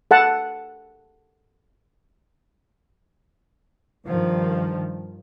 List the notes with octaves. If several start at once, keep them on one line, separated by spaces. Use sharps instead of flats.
A4 F#5 A5
G2 D#3 F3